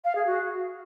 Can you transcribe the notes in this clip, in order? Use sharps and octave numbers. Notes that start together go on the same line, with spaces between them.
F5
G#4
F#4